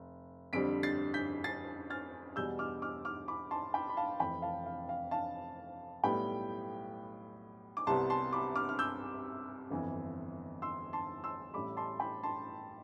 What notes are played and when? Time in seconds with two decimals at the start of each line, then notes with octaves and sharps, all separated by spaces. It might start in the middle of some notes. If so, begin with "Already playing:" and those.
Already playing: F1
0.53 F2 D3 G3 C4 B6 D7
0.83 A6 C7
1.14 G6 B6
1.44 A6 C7
1.90 F6 A6
2.36 E2 B2 G3 E6 G6
2.59 D6 F6
2.82 D6 F6
3.05 D6 F6
3.28 B5 D6
3.51 A5 C6
3.74 G5 B5
3.89 B5
3.97 F5 A5
4.20 F1 F2 E3 G5 B5
4.42 F5 A5
4.66 F5
4.89 F5
5.11 F5 A5
6.04 B1 A2 G3 B3 G5 B5
7.77 D6
7.87 C2 C3 G3 B3 A5 C6
8.10 A5 C6
8.33 B5 D6
8.56 D6 F6
8.69 F6
8.79 E6 G6
9.70 G1 F2 E3
10.62 C6 E6
10.93 A5 C6
11.24 C6 E6
11.54 A1 A2 G3 B5 D6
11.77 A5 C6
12.00 G5 B5
12.23 A5 C6